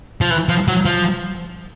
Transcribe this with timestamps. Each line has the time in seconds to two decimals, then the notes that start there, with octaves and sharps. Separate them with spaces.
0.21 F3
0.30 E3
0.49 F3
0.68 F#3
0.85 F3